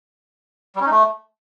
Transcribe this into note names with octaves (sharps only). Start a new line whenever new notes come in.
G3
C#4
D#4
A3